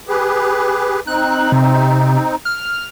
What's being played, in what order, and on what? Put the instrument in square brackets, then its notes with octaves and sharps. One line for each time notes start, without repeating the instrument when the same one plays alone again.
[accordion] G4 G#4 B4
[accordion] C4 D#4 [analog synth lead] F#6
[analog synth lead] C3
F6